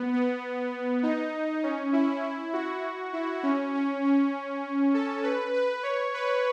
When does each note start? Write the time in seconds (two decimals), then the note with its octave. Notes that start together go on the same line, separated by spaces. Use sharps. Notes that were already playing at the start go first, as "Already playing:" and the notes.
Already playing: B3
0.13 B3
1.03 D#4
1.63 C#4
1.93 E4
2.23 E4
2.53 F#4
3.13 E4
3.43 C#4
3.74 C#4
4.04 C#4
4.94 A4
5.23 B4
5.54 B4
5.83 C#5
6.14 B4